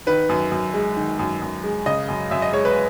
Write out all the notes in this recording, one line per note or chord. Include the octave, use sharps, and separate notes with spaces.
D#3 B4
F#2
F#2
G#3
D#3
F#2
F#2
G#3
C#3 D#5
F#2
F#2 E5
D#5
G#3 C#5
B4